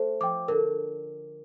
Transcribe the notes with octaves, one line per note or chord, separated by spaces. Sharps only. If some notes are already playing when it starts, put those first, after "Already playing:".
Already playing: A3 C5
F3 G5 D6
D3 A#4